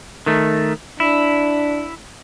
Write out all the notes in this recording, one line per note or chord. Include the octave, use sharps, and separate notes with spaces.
D#3 A3
D4 E4